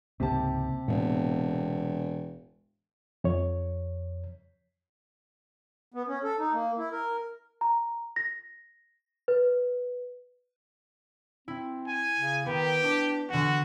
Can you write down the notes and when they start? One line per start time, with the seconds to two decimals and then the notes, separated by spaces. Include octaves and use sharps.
0.20 C#2 G#2 C3 A#3 G4 A5
0.88 E1 A2 B3
3.24 F2 C#5
5.94 B3
6.08 C#4
6.24 A4
6.39 D#4
6.53 A#3
6.78 E4
6.92 A#4
7.61 A#5
8.16 A#6
9.28 B4
11.48 C4 E4
11.87 G#5
12.17 C#3
12.46 D#3 B3 G4
12.84 D4 D6
13.30 D3 E3 F#4 F#5